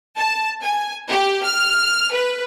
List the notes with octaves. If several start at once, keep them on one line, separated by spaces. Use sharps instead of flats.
A5
G#5
G4
F6
B4